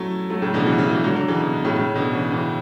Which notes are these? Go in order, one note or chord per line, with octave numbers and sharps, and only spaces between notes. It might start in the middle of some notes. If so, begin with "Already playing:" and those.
Already playing: F#3 A3 C#4 E4
F#3 A3
A2 C#3
B2 D3
C#3 E3
C#3 E3
C#3 E3
D3 F#3
D3 F#3
C#3 E3
B2
B2
A2 C#3
A2 C#3
B2 D3
C#3 E3
C#3 E3